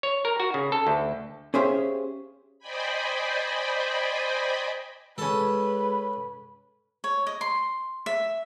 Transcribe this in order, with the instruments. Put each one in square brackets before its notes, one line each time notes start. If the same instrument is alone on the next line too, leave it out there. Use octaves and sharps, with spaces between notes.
[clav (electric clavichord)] C#5
A#4
F#4
C#3
A4
D2
[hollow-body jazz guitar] C#4 G4 G#4 C5 E5 F5
[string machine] C5 D5 D#5 G5 G#5 B5
[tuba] G#3 [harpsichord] C#4 A4 [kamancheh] B4 [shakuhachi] B5
[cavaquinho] C#5
D#5
C6
E5